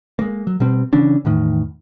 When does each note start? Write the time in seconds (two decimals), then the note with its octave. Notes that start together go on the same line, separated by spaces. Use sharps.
0.19 G#3 A#3
0.47 F#3
0.60 B2 G3 C4
0.93 C#3 E3 C#4 D4
1.25 E2 A2 D#3